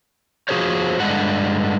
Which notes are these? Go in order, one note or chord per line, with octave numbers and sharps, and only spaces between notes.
F3 B3 F#4 G#4 C5 C#5
G2 D3 G#3 F#5